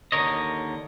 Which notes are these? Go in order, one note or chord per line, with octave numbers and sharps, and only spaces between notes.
D#2 D3 A#4 C#5 D#5